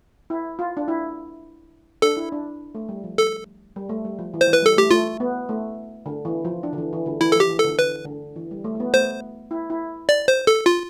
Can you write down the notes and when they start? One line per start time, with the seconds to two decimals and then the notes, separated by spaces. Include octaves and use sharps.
0.30 E4
0.59 F4
0.77 D4
0.88 E4
2.02 D4 A4
2.17 E4
2.32 D4
2.75 A3
2.89 G3
3.04 F3
3.18 A4
3.76 G3
3.89 A3
4.05 G3
4.19 F3
4.34 E3
4.41 C5
4.47 E3
4.53 B4
4.62 G3 A4
4.77 A3 G4
4.91 A3 F4
5.20 B3
5.49 A3
6.06 D3
6.25 E3
6.45 F3
6.63 D4
6.73 D3
6.78 E3
6.93 E3
7.06 D3
7.21 E3 E4
7.32 A4
7.35 F3 G4
7.50 E3
7.59 A4
7.64 D3
7.79 D3 B4
8.05 D3
8.36 E3
8.51 G3
8.64 A3
8.75 A3
8.80 B3
8.93 A3 C5
9.51 E4
9.70 E4
10.09 D5
10.28 C5
10.47 A4
10.66 F4